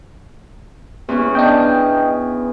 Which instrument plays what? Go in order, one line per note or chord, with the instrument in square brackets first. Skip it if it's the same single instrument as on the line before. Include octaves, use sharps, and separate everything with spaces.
[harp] E2 B3 C#4
[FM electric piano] D4 D#5 G5